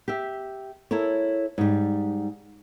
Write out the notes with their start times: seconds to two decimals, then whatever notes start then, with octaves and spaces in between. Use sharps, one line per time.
0.08 G4 E5
0.91 E4 A4 A#4 C#5
1.58 G#2 G3